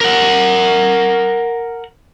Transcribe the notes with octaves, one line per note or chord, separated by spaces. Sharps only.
A#4 F#5